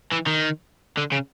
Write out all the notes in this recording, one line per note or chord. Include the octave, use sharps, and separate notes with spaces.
E3
D#3
D3
C#3